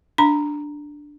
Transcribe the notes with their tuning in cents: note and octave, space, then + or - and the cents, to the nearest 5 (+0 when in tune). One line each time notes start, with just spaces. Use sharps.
D4 +0 A#5 +0